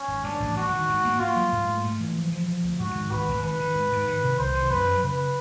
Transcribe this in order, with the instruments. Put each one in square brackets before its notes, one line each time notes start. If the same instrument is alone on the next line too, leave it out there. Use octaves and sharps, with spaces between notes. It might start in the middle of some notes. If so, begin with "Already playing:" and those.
Already playing: [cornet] C#4
[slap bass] G#1
[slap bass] G2 [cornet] D4
[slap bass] A1
[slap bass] G2 [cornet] F#4
[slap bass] D#3
G#2
A#3
[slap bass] A#3 [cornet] F4
[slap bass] F#3
G#2
A3
A3
E3
F3
F3
F3
D2
[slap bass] G#2 [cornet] F#4
[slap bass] D#3
[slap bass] G#1 [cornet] B4
[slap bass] G#1
[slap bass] D#3 [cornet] B4
[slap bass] D#3
G#2
G#2
D#3
C3
[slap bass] C2 [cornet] C5
[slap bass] D#3
[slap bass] F#2 [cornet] B4
[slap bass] F#3
[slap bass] C#3 [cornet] B4